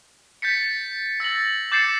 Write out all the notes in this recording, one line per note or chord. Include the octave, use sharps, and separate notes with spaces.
G6 A6 B6 C#7
E6 A6 A#6 F#7
D6 G6 A6 C7 C#7 E7